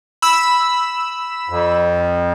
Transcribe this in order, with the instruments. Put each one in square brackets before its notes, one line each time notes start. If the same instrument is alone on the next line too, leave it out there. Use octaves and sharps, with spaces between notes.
[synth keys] B5 E6
[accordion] F2